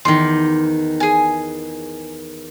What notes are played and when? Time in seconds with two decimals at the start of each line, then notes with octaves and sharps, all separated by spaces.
0.05 E2 D#3 C6 D6
1.00 G#4 G#5